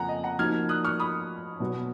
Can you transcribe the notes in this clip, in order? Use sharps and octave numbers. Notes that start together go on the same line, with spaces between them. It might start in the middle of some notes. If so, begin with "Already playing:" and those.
Already playing: F2 C#3 F3 A#3 F#5 G#5 A#5
D#5
F#5 A#5
F3 A#3 D#4 F#4 F6 G#6
D#6 F#6
C#6 F6
B5 D#6
B2 F#3 B3 F#4